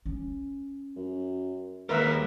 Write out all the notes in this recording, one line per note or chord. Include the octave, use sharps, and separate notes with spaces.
C#4
F#2
D#2 G3 G#3 A#4 B4 E5